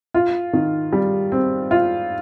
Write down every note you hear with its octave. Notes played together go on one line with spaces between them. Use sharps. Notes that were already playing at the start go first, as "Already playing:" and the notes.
F4
D#3
G3
C4
F4